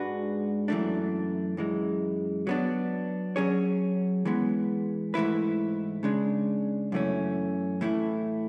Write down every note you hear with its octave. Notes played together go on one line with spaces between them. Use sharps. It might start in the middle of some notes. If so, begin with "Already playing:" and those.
Already playing: G#2 G#3 D4 F#4 B4
F#2 E3 A3 D4
F#2 E3 G#3
F#3 B3 D4
F#3 C#4 G#4 C#5
E3 G#3 B3
G#2 E3 A3 E4 B4
C#3 G#3 D4
F#2 E3 A3 C#4
A2 E3 A3 E4